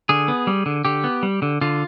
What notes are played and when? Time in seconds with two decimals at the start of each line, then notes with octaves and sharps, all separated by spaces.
0.09 D3 G#4
0.28 B3
0.47 G3
0.66 D3
0.85 D3 G4
1.04 B3
1.23 G3
1.42 D3
1.61 D3 F4